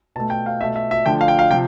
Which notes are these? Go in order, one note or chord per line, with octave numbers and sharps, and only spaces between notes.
B2 A3 A5
G5
F5
B2 A3 E5
E5
E5
D3 F3 A3 G5
F5
G5
F5
C3 F3 G5